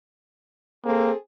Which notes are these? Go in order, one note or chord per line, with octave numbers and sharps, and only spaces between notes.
A#3 C4 G#4 A4